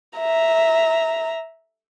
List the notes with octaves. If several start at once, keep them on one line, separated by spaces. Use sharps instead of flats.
E5 A#5